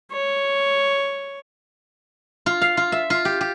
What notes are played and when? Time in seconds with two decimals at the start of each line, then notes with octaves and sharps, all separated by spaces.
0.12 C#5
2.46 F4
2.61 F5
2.77 F4
2.92 E5
3.10 F4
3.25 G4
3.41 G4